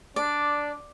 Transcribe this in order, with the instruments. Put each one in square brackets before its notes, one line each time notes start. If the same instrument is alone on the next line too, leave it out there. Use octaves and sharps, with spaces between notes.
[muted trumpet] D4 [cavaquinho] D5